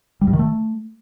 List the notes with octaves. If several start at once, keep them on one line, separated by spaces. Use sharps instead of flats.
G3
G2
D#3
A3